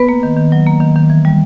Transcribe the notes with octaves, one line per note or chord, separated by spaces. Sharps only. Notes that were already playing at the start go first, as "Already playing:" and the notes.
Already playing: B3 B4
A#3
D#3
D#3
F#3
A#3
D#3
D#3
E3
G3